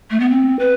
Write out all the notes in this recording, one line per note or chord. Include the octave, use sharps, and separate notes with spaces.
A3
B3
C4
B4